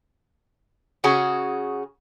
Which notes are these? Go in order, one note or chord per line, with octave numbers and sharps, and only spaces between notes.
C#3 C#4 F#4 G#4